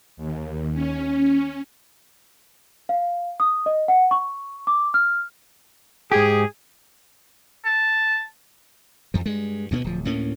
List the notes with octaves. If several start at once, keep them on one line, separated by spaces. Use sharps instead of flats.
D#2
C#4
F5
D#6
D#5
F#5
C#6
D6
F6
G#2 G4 G#4
A5
F2 F3
G2 G#3
D2 B2 A3 B3
D1 F3
D2 A2 A#3 C#4